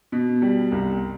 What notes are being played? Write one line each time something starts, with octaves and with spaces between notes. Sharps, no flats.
B2
G3
C2